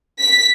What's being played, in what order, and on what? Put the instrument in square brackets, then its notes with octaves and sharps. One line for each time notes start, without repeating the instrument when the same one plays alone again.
[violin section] B6